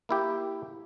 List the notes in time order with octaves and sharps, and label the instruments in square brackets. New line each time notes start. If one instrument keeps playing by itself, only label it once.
[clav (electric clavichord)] A#3 E4 G4